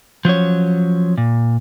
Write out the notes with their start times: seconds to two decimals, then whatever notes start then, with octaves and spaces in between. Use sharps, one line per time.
0.25 F3 F#3 C#4 C#5
1.18 A#2